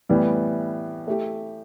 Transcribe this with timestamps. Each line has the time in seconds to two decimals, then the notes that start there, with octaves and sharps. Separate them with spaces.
0.09 A2 E3 G3 B3
1.07 A3 E4 G4